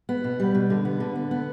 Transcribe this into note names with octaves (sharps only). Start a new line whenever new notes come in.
B3
B2
G3
B2
D3
B3
D3
B3
B3